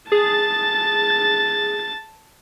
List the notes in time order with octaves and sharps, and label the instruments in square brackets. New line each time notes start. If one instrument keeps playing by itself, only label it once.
[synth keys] G#4 [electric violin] A5 A6